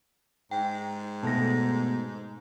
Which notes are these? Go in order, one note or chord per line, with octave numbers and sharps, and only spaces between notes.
G#2 G5
B2 A3 A5 A#6